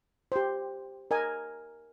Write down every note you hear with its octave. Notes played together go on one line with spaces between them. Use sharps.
G4 C5
A#4 D#5 G#5